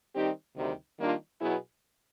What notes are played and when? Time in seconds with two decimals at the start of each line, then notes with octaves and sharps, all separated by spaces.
0.15 D#3 G3 C4 D#4 G4
0.57 D2 C3 D#3 G3
0.99 D#3 G3 A#3 D4 F4
1.41 B2 F#3 B3 E4 G#4